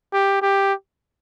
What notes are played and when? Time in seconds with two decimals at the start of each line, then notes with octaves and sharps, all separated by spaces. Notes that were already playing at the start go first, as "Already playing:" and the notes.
0.13 G4
0.42 G4